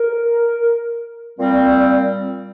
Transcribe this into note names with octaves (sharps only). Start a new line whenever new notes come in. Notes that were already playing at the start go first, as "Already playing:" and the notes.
Already playing: A#4
A#2 G3 C4